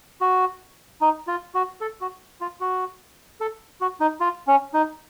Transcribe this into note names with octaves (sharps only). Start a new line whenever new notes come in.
F#4
D#4
F4
F#4
A4
F#4
F4
F#4
A4
F#4
D#4
F4
C#4
D#4